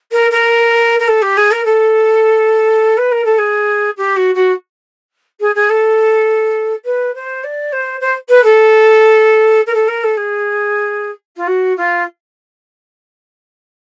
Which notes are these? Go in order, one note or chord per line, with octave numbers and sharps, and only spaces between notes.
A#4
A#4
A#4
A4
G4
G#4
A#4
A4
B4
A#4
A4
G#4
G4
F#4
F#4
G#4
G#4
A4
B4
C5
D5
C5
C5
B4
A4
A#4
A4
A#4
A4
G#4
F4
F#4
F4